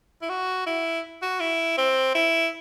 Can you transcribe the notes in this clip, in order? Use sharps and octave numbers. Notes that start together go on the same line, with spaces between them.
E4
F#4
E4
F#4
E4
C4
E4